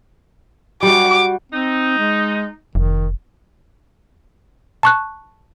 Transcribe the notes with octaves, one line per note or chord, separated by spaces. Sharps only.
G3 F#4 D6
C4 D#4
G#3
F1 D#3
A5 C#6 F#6